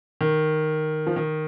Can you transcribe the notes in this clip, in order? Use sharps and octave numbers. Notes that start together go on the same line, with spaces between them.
D#3
F3
D#3